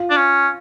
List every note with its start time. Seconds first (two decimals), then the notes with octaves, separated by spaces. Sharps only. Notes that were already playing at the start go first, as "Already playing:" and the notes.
Already playing: F4
0.10 D4
0.16 C#4